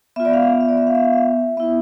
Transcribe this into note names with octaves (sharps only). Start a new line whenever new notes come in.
B3 F4 E5
D5
F5
E5
E5
D5
E5
F5
E5
F5
E5
B3 E4 E5